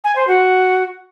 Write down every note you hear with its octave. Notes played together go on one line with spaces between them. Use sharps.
G#5
C5
F#4